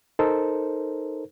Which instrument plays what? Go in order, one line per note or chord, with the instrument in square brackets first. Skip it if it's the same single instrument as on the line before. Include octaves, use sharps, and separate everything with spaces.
[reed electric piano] D#4 A4 A#4 C5